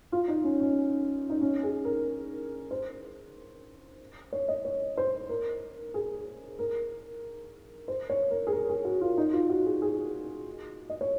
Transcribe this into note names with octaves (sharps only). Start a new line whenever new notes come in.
F4
D#4
C#4
C#4
D#4
C#4
G#4
A#4
C5
C#5
D#5
C#5
C5
A#4
G#4
A#4
C5
C#5
A#4
G#4
A#4
G#4
F#4
F4
D#4
F4
F#4
G#4
G#4
D#5
C#5